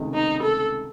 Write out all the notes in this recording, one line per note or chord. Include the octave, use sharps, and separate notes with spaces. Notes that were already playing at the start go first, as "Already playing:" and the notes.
Already playing: C#2 C3 D#3 A3
D#4
A4